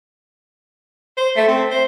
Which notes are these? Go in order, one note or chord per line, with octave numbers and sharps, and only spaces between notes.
C5
A3
C4
C5